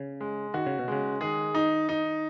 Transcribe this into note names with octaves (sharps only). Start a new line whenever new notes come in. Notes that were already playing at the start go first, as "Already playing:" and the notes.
Already playing: C#3
G#3
D#3 F#4
C#3
B2
C#3 G#3
D#3 G#4
D#4
D#4